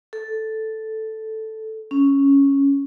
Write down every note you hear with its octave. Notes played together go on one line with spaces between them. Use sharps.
A4
C#4